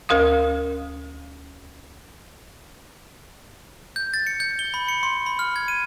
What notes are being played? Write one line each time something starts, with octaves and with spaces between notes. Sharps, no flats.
D2 A#4 F5 D#6
G6
A6
C#7
G6
G7
B5
C#7
C6
B5
F6
G#6
D#7